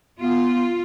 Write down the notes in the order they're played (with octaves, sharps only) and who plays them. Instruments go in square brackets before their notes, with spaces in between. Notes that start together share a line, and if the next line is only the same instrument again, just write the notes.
[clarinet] B3 [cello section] F4